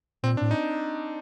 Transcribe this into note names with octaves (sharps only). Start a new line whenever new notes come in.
A#2 C4
D4
A2
D#4